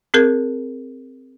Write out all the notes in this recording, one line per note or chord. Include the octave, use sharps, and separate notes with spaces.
C4 G#4 A#4 G#6